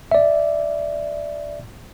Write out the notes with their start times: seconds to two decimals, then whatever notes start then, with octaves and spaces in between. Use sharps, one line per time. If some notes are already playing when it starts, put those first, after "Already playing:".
0.12 D5 E5